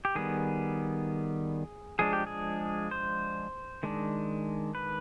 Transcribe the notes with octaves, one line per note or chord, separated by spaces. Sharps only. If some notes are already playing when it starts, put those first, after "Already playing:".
G4
D#3 G3 B3 G#4
F3 G#3 D4 G#4
G4
G#4
C5
D#3 G#3 D4
B4